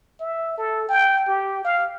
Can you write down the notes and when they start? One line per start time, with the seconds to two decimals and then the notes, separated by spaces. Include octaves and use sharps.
0.20 E5
0.58 A4
0.89 G5
1.28 G4
1.65 F5